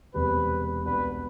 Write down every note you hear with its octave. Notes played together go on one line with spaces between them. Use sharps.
E1 E2 C3 G3 B4
C2 B2 G3 B3 D4 B4